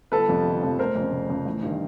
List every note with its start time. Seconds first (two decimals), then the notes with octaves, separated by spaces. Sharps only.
0.12 G1 A4 B4
0.28 F2 C3 F3
0.45 G1
0.63 F2 C3 F3
0.79 F1 A#4 C5
0.95 F2 C#3
1.12 F1
1.30 F2 C#3
1.46 A1
1.63 G2 D#3